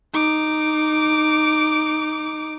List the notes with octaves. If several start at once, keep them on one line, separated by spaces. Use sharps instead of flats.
D#4 D6